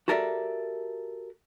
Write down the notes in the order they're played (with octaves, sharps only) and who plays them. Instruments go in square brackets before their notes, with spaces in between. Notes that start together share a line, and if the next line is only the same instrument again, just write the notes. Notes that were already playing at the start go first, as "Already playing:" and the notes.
[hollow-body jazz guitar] F#4 G4 A4 A#4 D5 E5